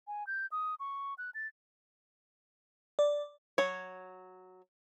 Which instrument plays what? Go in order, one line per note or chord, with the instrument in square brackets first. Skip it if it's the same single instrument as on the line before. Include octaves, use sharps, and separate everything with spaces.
[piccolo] G#5
G6
D#6
C#6
F#6
A6
[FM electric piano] D5
[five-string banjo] F#3 C#5